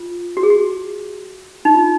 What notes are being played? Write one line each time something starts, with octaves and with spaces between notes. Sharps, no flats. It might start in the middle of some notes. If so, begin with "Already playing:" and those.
Already playing: F4
F#4
G#4
F#4
D#4
F4